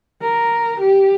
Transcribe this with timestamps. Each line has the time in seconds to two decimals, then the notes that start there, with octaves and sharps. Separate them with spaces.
0.22 A#4
0.80 G4